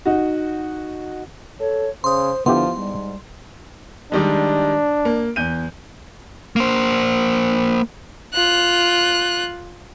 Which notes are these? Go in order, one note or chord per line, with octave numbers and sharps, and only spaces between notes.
D#4 F#4
A4 C#5
C#3 C5 C6 D#6
D3 F3 B3 E4 G4 C6
G#2 G3
D#3 G3 G#3 D4
A#3
E2 G6 D#7
A#3 C5
F4 F#6